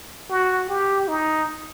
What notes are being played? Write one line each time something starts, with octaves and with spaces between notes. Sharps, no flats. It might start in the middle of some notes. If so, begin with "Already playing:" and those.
F#4
G4
D#4